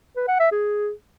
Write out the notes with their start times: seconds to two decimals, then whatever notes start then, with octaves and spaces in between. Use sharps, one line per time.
0.16 B4
0.28 F#5
0.40 E5
0.52 G#4